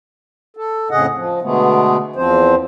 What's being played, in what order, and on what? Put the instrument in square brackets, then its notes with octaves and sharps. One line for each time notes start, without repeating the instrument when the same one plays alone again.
[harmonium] A4
F2 A2 C#3 G#4 D#5 F#5
F3
B2 D3 G#3 A3 B3
E2 F3 C4 C5